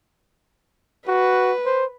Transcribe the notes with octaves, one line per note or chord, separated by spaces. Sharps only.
F#4 B4
C5